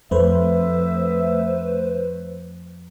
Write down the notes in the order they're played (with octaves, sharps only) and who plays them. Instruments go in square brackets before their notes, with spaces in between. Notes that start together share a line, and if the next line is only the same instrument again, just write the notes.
[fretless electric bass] F2 [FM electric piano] A3 B4 C5 [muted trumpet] E5